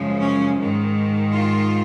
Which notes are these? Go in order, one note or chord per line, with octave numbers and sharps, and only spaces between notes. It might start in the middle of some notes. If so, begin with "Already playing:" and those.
Already playing: F#2 C#3 F3 G#3
C#4
G#2 D#3 G#3
F4